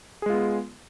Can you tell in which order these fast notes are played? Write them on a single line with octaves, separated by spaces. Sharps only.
G#4 G#3 F4 B3